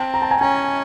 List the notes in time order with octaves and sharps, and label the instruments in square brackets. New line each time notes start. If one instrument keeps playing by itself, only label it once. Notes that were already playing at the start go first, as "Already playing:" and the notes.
Already playing: [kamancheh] C4 [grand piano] G5 A5
[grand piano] A#5
A5
G#5 A#5
[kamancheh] C#4 [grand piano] G#5 A#5